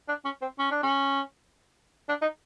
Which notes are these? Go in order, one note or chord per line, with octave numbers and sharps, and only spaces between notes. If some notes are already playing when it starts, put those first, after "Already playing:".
D4
C#4
C4
C#4
D4
C#4
D4
D#4